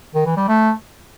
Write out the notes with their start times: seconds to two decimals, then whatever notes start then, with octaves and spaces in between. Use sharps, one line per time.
0.14 D#3
0.26 E3
0.37 G3
0.48 A3